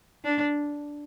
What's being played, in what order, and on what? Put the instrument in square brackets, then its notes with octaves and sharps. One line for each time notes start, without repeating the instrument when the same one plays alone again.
[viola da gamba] D4